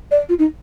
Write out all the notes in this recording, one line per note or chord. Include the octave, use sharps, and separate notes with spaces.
D5
F4
D#4